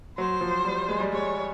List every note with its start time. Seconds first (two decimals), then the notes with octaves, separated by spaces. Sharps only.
0.17 F#3 C5
0.41 F3
0.65 G3
0.89 G#3
1.00 G3
1.13 G#3 C#5